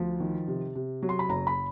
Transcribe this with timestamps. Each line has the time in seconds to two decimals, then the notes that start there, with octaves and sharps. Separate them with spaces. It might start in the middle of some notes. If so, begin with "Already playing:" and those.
Already playing: D2 F3
0.20 D#3
0.48 C3
0.75 C3
1.02 F#3
1.09 C6
1.19 B5
1.29 F#1 A#5
1.47 B5